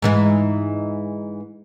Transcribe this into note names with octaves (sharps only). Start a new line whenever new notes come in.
G#2 E3 G#3